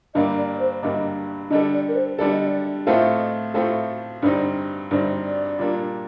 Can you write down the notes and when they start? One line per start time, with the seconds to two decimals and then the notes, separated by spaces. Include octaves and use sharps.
0.14 G2 D3 G3 A#3 D4 D#5
0.38 D5
0.54 D5
0.59 C5
0.83 G2 D3 G3 A#3 D4 D#5
1.50 D3 G3 D4 A4 D#5
1.74 D5
1.88 A#4
1.95 C5
2.18 D3 G3 D4 A4 D5
2.32 D#5
2.46 D5
2.86 A2 A3 C4 F4 A4 D#5
3.54 A2 A3 C4 F4 A4
4.22 G2 D3 G3 C4 D#4 D5
4.91 G2 D3 G3 C4 D#4 D5
5.25 D5
5.59 A#2 G3 A#3 D4